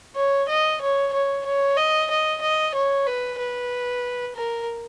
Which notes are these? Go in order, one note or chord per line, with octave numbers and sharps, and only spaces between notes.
C#5
D#5
C#5
C#5
C#5
D#5
D#5
D#5
C#5
B4
B4
A#4